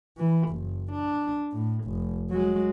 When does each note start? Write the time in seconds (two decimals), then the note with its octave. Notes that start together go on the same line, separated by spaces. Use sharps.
0.17 E3
0.49 F#1
0.92 D4
1.53 A2
1.85 F1
2.30 F#3 G#3